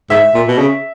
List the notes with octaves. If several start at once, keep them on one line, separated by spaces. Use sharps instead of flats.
G#2 E5
A#2
B2
C#3